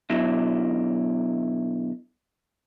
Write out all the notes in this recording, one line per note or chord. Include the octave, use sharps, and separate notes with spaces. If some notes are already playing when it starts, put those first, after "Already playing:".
B2 D3 F#3 E4